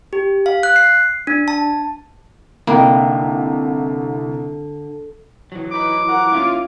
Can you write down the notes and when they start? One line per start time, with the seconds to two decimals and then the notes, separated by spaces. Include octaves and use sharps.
0.13 G4
0.46 F5
0.63 F#6
0.76 C7
1.27 D4
1.48 A5
2.67 C2 D3 A#3 D#4 G5 B5
5.52 E3 F#3
5.71 D#4 B4 D6
6.07 F3 A#4 F#5
6.32 A#3 C#4 E4 F4